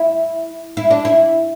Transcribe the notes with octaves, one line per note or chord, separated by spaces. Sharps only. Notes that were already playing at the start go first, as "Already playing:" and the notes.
Already playing: E4
E4
D4
E4